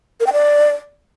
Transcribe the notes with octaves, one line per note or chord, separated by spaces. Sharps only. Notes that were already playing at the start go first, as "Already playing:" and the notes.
A#4
G5
D5